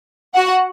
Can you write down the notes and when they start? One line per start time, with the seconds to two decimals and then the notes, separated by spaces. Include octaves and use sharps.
0.35 F#4 F#5